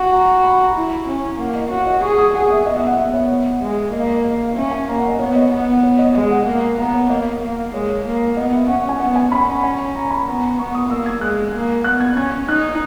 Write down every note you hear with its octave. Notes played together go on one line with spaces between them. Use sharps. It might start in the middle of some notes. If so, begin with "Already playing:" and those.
Already playing: F#4
A#5
B5
A#5
E4
C#4
A#3 F#5
D#5
F#4 C#5
D#5
G#4 C#6
D#6
G#4 F#5
E5
B3 D#5
E5
F#5
B3 E5
C#5
G#3
A#3 D#5
D#5
D#5
C#4 E5
G#5
A#3 A#5
F#5
D#5
B3 C#5
D#5
B3
C#5
D#5
G#3 D#5
F#5
A#3
B3 A#5
C#5
A#3 D#5
A#3
G#3 C#5
A#3
B3 D#5
E5
C#4 F#5
G#5
B3 F#5
G#5
C#4 B5
G#5
A#5
B5
B3 A#5
B3 C#6
D#6
A#3 E6
G#6
G#3 F#6
A#3
B3 F#6
G#6
C#4 G#6
D#4 F#6